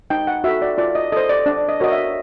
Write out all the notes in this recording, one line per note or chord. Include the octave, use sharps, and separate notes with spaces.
D#4 G5
F#5
F#4 A4 E5
D5
F4 D5
D#5
A4 C5 D#5
D5
D4 D5
D#5
F#4 A#4 C#5 D#5
E5